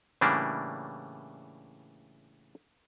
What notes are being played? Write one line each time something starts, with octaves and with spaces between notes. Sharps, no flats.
A2 C#3 E3 G3 A#3 D4